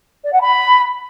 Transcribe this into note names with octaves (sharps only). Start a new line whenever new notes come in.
D5
F#5
B5